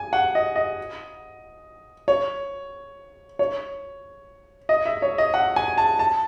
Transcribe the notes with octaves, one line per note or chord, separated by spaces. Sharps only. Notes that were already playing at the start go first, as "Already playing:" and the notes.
Already playing: G#5
F#5
D#5
D#5
C#5
C#5
D#5
E5
C#5
D#5
F#5
G#5
A5
A5